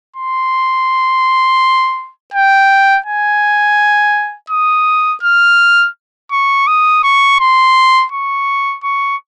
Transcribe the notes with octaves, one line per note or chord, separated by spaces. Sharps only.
C6
G5
G#5
D#6
F6
C#6
D#6
C#6
C6
C#6
C#6